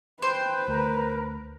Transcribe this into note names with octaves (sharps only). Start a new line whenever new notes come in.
B4 C5 G5
D2 A#4 A#5